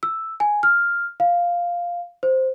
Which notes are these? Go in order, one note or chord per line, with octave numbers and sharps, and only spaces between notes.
E6
G#5
F6
F5
C5